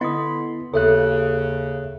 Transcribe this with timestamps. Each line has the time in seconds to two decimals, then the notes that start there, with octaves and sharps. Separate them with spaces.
0.01 D3 B3 E4 D#5 B5 C6 D#6
0.74 D#2 C#3 A4 C#5 E5 F#6